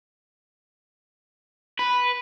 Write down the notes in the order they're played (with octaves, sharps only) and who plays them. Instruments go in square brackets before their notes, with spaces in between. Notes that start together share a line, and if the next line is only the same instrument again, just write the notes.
[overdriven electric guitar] B4